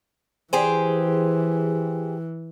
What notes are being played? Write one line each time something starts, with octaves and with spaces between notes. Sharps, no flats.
E3 G4 G#4 C5